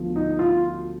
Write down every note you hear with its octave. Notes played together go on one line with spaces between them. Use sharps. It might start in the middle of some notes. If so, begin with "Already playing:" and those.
Already playing: D2 D3 F3 B3
D#4
F4